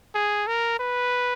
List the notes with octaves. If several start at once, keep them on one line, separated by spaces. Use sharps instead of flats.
G#4
A#4
B4